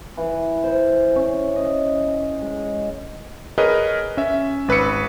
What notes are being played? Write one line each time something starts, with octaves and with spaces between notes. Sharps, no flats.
E3
C5
C#4
D#5
G#3
G#4 A#4 B4 C#5 D#5
C#4 E5
G#1 B4 E6 C#7